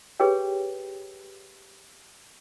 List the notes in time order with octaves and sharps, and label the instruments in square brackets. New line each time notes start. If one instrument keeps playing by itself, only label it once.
[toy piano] G4 G#4 B4 C#5 G5